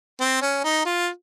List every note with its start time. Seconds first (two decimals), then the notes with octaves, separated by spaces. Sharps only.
0.20 C4
0.42 C#4
0.64 D#4
0.86 F4